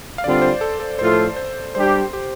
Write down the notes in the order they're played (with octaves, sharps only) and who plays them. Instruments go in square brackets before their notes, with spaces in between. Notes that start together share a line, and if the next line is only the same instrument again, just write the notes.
[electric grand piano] F5
[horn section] D3 G3 C4 F4 [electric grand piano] D5
[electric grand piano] C5
A4
A4
[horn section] A2 F3 A3 F4 A4 [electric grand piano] C5
[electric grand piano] C5
[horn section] G3 D4 G4 [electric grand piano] C5
[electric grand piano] G4